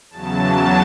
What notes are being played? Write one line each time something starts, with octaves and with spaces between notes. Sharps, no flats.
E2 C#3 F#3 A5